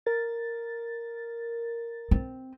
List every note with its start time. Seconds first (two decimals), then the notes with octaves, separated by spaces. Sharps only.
0.06 A#4 A6
2.11 C4